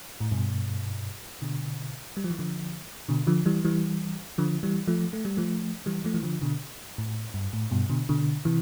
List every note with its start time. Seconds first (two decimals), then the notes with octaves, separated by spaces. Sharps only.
0.20 A2
0.31 G2 B2
1.42 B2 D3
2.17 G3
2.24 F3
2.31 E3
2.39 D3 F3
3.09 B2 D3
3.27 D3 F3
3.46 E3 G3
3.64 E3 G3
4.38 D3 F3
4.63 E3 G3
4.87 F3 A3
5.13 A3
5.25 G3
5.37 F3 A3
5.86 E3 G3
6.05 F3 A3
6.14 E3
6.23 D3 F3
6.42 B2 D3
6.98 A2
7.34 G2
7.53 A2
7.71 G2 B2
7.90 B2 D3
8.09 B2 D3
8.45 C3 E3